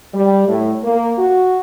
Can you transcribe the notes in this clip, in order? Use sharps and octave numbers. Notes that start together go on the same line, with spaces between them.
G3
A2
A#3
F#4